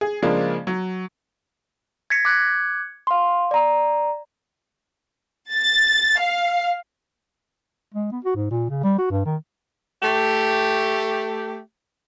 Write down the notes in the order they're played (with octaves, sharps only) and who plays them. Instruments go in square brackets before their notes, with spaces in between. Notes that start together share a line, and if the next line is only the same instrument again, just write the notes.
[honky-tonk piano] G#4
C#3 F3 G#3 A#3 D4
F#3
[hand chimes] G#6 A#6 B6 C#7
D6 F#6 G#6 C#7
F5 C6
D5 A#5
[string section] A6
F5
[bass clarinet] G#3
B3
F#4
G#2
A#2
C#3
G3
F#4
G2
D#3
[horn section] A3 G4